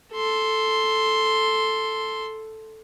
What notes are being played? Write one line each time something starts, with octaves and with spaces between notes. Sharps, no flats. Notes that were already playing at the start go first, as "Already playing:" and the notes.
A4 C6